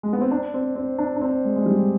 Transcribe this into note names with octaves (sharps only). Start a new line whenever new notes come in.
G#3
B3
C4
D4
C4
C4
D4
D4
C4
G#3
G#3
G3